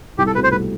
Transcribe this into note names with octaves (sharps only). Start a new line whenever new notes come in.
C2 G4
A4
B2 A3 C4 B4
C5
C2 B4